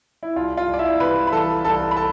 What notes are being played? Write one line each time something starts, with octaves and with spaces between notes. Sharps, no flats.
E4
C2 F4
F4
C2
D5
E4 E5
C3 B4 B5
B5
E3 A4 A5
C2 A4 A5
B5
A4 A5